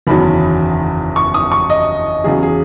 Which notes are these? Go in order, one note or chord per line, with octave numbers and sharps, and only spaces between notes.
F#1 E2 D#3 F#3 B5
C#6
D#6
C#6
D#5
E2 C#3 F#3 G#4
G#4